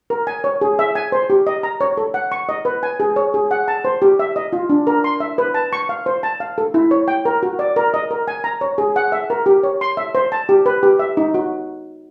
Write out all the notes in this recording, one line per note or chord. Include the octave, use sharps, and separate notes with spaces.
A#4
G#5
C#5
G#4
E5
G#5
C5
G4
D#5
A#5
C#5
A4
F#5
C#6
D#5
B4
G#5
G#4
C#5
G#4
F#5
A5
C5
G4
E5
D#5
F4
D4
A#4
C6
E5
B4
A5
C#6
F5
C5
A5
F5
A4
E4
C#5
G5
A#4
F#4
D5
A#4
D#5
A#4
G#5
A#5
C#5
G#4
F#5
E5
A#4
G4
C#5
C6
E5
C5
A5
G4
B4
G4
E5
D#4
F#4